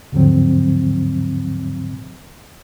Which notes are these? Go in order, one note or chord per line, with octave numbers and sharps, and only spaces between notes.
D#2 G#2 D3 F3 F#3 C4